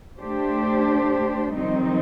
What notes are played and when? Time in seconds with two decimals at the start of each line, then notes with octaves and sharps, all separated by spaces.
0.19 A3 D4 G4 C5
1.54 F2 D#3 G3 C4 D#4